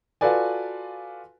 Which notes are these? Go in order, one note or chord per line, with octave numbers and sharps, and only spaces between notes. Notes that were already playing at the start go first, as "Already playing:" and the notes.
F4 F#4 A4 B4 D5 G#5